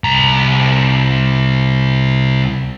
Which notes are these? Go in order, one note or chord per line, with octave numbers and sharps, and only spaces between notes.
C2 A#5